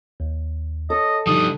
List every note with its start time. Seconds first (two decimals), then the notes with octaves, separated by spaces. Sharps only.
0.20 D#2
0.90 A4 C#5 D#5
1.27 B2 D3 F3 G3 D#4 D#6